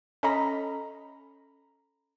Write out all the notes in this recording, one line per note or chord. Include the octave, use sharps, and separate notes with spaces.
C#4 A4 D#5 A#5 B5